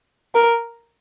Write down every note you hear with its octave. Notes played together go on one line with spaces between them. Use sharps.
A#4